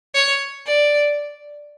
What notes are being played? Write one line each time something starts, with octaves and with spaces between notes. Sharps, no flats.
C#5
D5